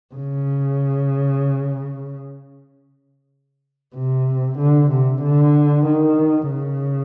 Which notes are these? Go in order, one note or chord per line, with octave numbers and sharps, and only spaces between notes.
C#3
C3
D3
C3
D3
D#3
C#3